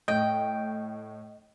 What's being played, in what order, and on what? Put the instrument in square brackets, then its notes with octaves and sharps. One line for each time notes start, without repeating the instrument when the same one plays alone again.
[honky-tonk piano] A2 [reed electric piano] D#5 [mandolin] G5